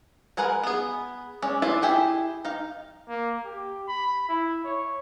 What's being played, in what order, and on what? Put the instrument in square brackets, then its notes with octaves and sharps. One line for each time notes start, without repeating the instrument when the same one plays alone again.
[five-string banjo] G#3 G#4 A#4 B4 F#5
B3 G#4
G#3 C#4 D5
D4 E4 F4 A4 A5
E4 G4 G#4
D#4 F5
[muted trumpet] A#3
G4
B5
E4
C#5